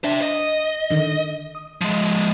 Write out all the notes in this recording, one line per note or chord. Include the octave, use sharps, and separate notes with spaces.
D4 C5 E5
D#5
D3 D#3
D#6
F3 G#3